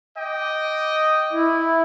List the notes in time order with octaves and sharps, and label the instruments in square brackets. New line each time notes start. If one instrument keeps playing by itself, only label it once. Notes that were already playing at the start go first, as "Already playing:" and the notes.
[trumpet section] D#5 G5 D6
[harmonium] E4